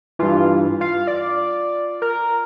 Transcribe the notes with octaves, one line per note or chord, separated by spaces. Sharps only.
G2 E3 F4
F4 F5
D5
A#4